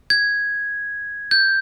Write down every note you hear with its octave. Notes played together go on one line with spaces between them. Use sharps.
G#6
G6